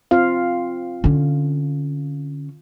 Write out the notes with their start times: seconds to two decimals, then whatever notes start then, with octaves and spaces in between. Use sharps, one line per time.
0.11 C4 F4 F5
1.04 D3 C#4